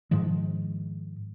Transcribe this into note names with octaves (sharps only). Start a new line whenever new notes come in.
G#2 D#3 F3 G#3